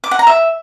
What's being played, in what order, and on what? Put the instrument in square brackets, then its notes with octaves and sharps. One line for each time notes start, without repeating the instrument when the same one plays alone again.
[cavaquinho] D6
F#5
A#5
E5